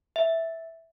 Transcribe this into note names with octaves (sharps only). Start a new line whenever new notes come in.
E5